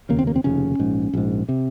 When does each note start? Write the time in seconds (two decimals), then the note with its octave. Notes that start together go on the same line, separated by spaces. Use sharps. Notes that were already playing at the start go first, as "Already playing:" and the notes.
0.09 F1 D#2 C#3 A#3
0.19 C4
0.27 A#3
0.36 C4
0.44 F1 D#2 C#3 C#4
0.79 A#1 G#2
1.13 A#1 G#2
1.49 C3